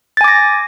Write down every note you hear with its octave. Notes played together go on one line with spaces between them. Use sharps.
G#5 D6 A6 A#6